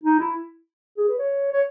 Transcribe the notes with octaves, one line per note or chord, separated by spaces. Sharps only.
D#4
E4
G#4
B4
C#5
C#5